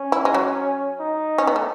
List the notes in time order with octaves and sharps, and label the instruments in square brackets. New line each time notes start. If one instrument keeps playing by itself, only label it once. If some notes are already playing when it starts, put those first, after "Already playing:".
Already playing: [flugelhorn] C#4
[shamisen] E4
G#3
F#3
[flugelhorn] D#4
[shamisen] C#4
B3
A3